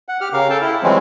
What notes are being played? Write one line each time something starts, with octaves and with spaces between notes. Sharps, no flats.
F#5
G4 F6
C#3 A#4 F5
A4 G5 A5
E4
E3 F3 G3 G#3 C4 C#4